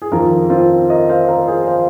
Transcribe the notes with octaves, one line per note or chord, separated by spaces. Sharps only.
G#4
F2 D#3 F4 A#4
C4 F4
A#4 D#5
C5 F5
A#4 D#5
G#4 C5
C5 F5